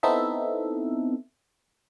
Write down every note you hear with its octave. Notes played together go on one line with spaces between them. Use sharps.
B3 C4 D#4 E4 A4 E5